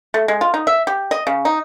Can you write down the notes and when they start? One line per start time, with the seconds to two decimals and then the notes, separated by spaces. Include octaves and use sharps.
0.14 A3
0.28 G#3
0.41 F4
0.54 D#4
0.67 E5
0.87 G4
1.11 D#5
1.27 C#3
1.45 D#4